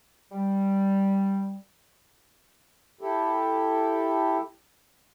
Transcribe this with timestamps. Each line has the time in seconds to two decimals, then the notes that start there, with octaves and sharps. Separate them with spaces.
0.31 G3
3.01 E4 G4 A4